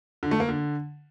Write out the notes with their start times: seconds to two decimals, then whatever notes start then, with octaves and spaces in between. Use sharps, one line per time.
0.23 D3
0.31 A3
0.40 A#3
0.49 D3